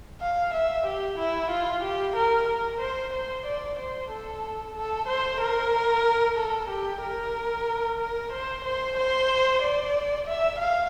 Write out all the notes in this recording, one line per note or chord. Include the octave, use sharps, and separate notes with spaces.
F5
E5
G4
E4
F4
G4
A#4
A#4
C5
C5
D5
C5
A4
A4
C5
A#4
A4
G4
A#4
A#4
C5
C5
C5
D5
E5
F5